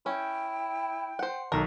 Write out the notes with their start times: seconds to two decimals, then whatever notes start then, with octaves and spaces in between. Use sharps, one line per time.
0.06 C#4 E4 G5
1.19 C5 F#5
1.52 B1 D#3 A4 A#4